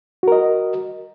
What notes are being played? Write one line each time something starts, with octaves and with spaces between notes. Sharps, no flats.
F#4 A#4 D#5